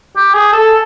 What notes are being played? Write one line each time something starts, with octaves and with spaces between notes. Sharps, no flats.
G4
G#4
A4